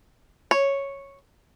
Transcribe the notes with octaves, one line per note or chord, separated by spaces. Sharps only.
C#5